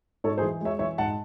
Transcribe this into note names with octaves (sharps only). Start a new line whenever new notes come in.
G#2 A4 C#5
G#4 C5
E3
G#3 C#5 E5
E3 C#5 E5
G#2 F#5 A5